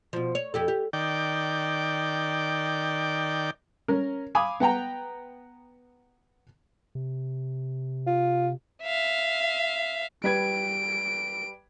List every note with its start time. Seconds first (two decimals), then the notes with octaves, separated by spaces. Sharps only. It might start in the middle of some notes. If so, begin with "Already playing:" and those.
0.13 B2 F3
0.35 C#5
0.54 F2 G4 A4
0.68 G4
0.93 D#3 D5 G5
3.88 C#4 A#4
4.35 F5 G#5 B5 D6 D#6
4.60 B3 F#5 G5 A#5
6.95 C3
8.07 F4
8.82 E5 F5
10.24 G3 B4 G#6 D7